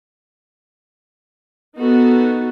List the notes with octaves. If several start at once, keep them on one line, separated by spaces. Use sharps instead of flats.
B3 D#4 F#4 A4